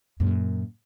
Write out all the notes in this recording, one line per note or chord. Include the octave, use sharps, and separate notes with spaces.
F#2 A#2